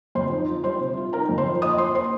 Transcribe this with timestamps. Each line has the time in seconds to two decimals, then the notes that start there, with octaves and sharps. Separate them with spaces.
0.15 F2 C5 C6
0.31 D#4
0.48 F3
0.64 G3 C5 C6
0.80 C3
0.97 F4
1.13 D#4 A#4 A#5
1.29 F2
1.38 C5 C6
1.46 F3
1.62 A#3 D#5 D#6
1.78 A#3 C5 C6
1.95 A#3 C5 C6